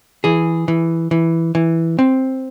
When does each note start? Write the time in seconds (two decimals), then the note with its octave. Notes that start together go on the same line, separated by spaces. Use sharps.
0.24 E3 G#4
0.68 E3
1.11 E3
1.55 E3
1.99 C4